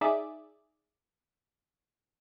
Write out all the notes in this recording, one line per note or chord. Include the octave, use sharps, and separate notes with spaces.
D#4 G#4 D5 E5